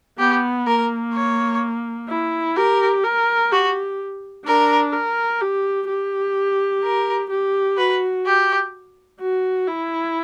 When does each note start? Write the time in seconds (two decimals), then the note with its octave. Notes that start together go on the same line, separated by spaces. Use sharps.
0.19 B3 G4
0.67 A#3 A#4
1.14 C#5
2.10 E4
2.57 G4 A#4
3.04 A#4
3.51 F#4 G4
4.46 D4 A#4
4.93 A#4
5.41 G4
5.88 G4
6.84 A#4
7.30 G4
7.78 F#4 B4
8.26 G4
9.20 F#4
9.68 E4